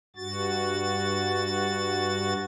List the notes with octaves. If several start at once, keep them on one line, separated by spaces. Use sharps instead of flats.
G2 F#4 A6